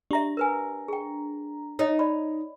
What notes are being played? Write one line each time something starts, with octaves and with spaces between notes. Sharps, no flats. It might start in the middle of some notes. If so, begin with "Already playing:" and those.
D4 G4 E5 A#5
A#4 B4 G#5
G#4 G5
D#4 C#5 D#5
D5 B5